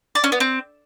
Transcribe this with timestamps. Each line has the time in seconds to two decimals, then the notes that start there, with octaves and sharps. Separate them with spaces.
0.15 D5
0.24 C#4
0.32 B3
0.40 C4